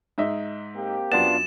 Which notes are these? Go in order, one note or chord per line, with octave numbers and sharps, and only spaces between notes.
G#2 D#4 E5
A#3 C4 G4
F#2 B3 D4 F4 F#5 A6 E7